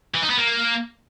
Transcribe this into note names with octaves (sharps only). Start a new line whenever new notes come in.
E3
D#4
B3
A#3